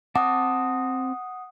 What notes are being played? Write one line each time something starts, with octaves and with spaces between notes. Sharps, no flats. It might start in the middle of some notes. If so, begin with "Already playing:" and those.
C4 F#5 A5 D6 D#6